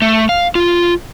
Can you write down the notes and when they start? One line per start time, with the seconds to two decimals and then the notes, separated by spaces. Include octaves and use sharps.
0.02 A3
0.29 F5
0.55 F4